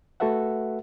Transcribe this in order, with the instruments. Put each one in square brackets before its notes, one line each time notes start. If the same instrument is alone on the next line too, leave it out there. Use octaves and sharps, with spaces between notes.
[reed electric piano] A3 F#4 A4 B4 E5 F#5